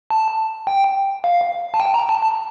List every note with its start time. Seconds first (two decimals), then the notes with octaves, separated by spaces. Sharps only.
0.10 A5
0.67 G5
1.24 F5
1.74 A5
1.80 G5
1.94 A#5
2.09 A5
2.23 A5